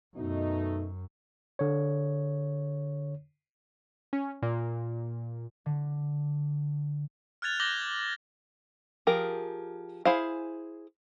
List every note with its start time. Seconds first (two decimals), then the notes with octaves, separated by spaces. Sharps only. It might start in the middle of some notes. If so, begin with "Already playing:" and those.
0.16 F#2 B2 A3 D#4
1.59 D3 C#5
4.13 C#4
4.42 A#2
5.66 D3
7.42 F6 F#6 G#6 A6 F7
7.60 D6 G6 A#6 F#7 G7
9.07 F3 G4 G#4 A#4
10.05 E4 G#4 C5 F5